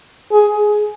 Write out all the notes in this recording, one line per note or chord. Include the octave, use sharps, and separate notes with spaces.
G#4